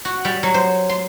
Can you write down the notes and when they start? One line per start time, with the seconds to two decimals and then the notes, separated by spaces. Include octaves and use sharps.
0.05 F#4
0.25 G3
0.43 F#3
0.54 C5
0.89 C6